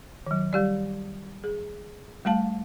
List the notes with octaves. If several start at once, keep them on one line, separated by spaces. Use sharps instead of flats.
D#3 F#3
G3 G4 D5
G#4
G3 A3 F5 A5